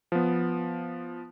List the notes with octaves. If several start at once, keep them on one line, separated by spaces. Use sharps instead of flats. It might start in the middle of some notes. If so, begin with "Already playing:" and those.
F3 B3